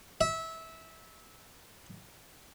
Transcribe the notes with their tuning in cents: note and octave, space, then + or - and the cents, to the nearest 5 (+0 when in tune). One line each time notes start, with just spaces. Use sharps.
E5 -20